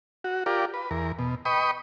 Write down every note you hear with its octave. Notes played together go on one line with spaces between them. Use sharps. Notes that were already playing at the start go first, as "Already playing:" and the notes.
F#4
F4 G4 A#4 D5
B4
E2 A#4
B2
B4 D#5 G5 B5 C#6 D#6